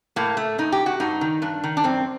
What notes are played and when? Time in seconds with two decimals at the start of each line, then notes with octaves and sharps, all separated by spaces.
0.16 A2 A#3
0.37 A3
0.58 A2 D#4
0.72 G4
0.86 F#4
1.00 G2 D#4
1.21 D#3
1.42 G2 D4
1.64 D#3
1.77 D4
1.84 F#2 C4